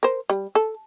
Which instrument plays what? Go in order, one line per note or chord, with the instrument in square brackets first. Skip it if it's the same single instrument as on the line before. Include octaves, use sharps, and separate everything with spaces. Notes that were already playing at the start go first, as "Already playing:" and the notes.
[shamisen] A#4 C5
G3
A4